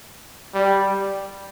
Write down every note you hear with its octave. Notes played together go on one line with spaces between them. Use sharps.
G3